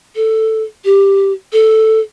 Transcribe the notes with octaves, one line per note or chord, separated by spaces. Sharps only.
A4
G4
A4